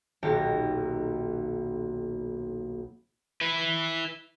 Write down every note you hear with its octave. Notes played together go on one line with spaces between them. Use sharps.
D#1 B1 G4 A#6
E4 B4